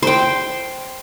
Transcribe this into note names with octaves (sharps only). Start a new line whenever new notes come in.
C5 G5